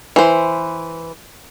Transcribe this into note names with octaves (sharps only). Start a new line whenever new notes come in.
E3 C5